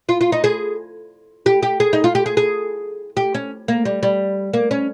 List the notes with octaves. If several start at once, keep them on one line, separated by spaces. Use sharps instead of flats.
F4
F4
D#4
G#4
G4
G4
G#4
D#4
F4
G4
G#4
G#4
G4
C#4
A#3
G3
G3
A#3
C#4